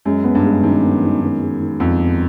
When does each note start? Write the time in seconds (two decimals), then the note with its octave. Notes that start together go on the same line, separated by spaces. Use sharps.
0.05 F#2 G#3
0.24 B3
0.35 G2
0.44 G#3
0.63 F#2 D#3
0.83 B3
1.03 D#3
1.21 D#3
1.41 G#3
1.61 D#3
1.80 F2 B3
2.00 B3